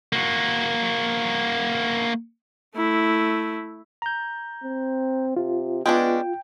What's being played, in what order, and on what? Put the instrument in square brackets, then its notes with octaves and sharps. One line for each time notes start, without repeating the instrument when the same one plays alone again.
[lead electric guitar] A#3 F#4
[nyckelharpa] A3 E4
[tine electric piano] A#5 G6
[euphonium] C4
[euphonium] C3 [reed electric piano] F4
[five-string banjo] G#3 C#4 D4 [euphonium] B3 [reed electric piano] F4 [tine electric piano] G5